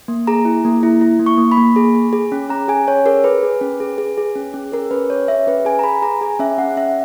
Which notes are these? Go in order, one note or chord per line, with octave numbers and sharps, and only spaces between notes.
A#3
G#4 A#5
E4
A#3
E4
E4
A#3
C#6
A#3
B5
A#3
G#4
G#4
G#4
C#4
C#4 A#5
G#4 G#5
C#4 C#5
G#4 A#4
G#4 B4
G#4
C#4
G#4
G#4
G#4
C#4
C#4
G#4 A#4
C#4 B4
G#4 C#5
C#4 E5
C#4 B4
G#4 G#5
A#5
G#4 B5
G#4 A#5
G#4 G#5
C#4 E5
C#4 F#5
C#4 E5